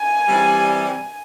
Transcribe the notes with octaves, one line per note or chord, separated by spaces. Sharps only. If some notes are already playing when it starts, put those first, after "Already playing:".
Already playing: G#5
C3 E3 G3